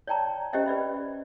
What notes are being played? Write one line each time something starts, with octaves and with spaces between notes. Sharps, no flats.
C#5 D5 G5 A5 A#5
C#4 G4 C5 D#5 E5 G5
B4 D5 E5 B5